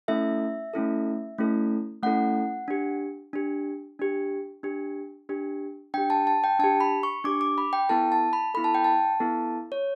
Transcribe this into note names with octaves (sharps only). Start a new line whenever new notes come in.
A3 C#4 E4 A4 E5
A3 C#4 E4 A4
A3 C#4 E4 A4
A3 C#4 E4 A4 F#5
D4 G4
D4 G4
D4 G4
D4 G4
D4 G4
D4 G4 G5
A5
A5
G5
D4 G4 A5
B5
C#6
D4 G4 D6
D6
B5
G5
B3 E4 A4 A5
A5
B5
B3 E4 A4 B5
A5
G5
A5
B3 E4 A4
C#5